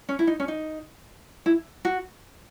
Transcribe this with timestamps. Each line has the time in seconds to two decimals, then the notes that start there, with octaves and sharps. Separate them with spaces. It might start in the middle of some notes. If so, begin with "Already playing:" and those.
0.09 C#4
0.19 E4
0.27 D#4
0.40 C#4
0.48 D#4
1.46 E4
1.85 F#4